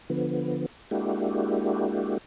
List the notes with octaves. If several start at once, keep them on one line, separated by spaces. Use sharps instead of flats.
D3 F3 B3
G#3 A#3 D4 E4 F#4 G4